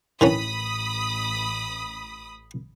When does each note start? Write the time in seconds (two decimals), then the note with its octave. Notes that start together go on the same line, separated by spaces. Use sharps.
0.21 A1 D#3 E3 C#4 B5 D#6